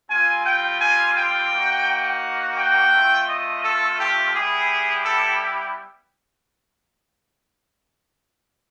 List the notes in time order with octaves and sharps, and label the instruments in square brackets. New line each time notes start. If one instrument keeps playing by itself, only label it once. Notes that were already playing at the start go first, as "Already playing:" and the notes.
[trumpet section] G3 C4 F4 G#5
G5
G#5
G5
A#3 D#4 F#4
G5
A3 C4 F4
D#5
A4
G4
G3 B3 E4 G4 G#4
A4